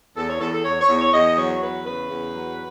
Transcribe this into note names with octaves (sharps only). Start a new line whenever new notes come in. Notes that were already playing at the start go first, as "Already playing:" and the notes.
E2 A4
C#5
E2 A4
A4
E2 C#5
C#5
E2
C#5
E2 D#5
F#3 C#5
C#5
E2 B4
C#3 B4
E2
F#3